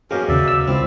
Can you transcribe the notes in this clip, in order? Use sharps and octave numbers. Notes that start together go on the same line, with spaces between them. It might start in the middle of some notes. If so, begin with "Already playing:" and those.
F#2 B2 A#3 C#4 G4 G#4 A#4
D#2 C#3 D5 E5
E6
C#2 C4 E4 D5